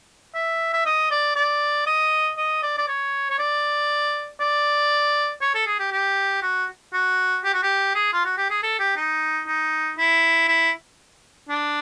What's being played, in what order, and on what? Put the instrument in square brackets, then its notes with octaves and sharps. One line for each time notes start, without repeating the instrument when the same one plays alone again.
[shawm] E5
E5
D#5
D5
D5
D#5
D#5
D5
D5
C#5
C#5
D5
D5
C#5
A4
G#4
G4
G4
F#4
F#4
G4
F#4
G4
G#4
F4
F#4
G4
G#4
A4
G4
D#4
D#4
E4
E4
D4